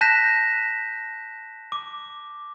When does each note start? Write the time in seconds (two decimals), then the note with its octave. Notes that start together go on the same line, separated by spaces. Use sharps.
0.01 A5 F#6 G6 A#6 B6 E7
1.72 D6